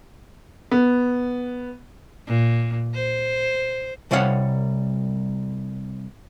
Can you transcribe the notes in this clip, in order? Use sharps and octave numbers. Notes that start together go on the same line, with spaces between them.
B3
A#2
C5
C2 C3 G3 C#5 F5 F#5